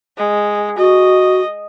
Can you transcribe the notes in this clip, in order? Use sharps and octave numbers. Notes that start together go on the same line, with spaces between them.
G#3
F#4 D#5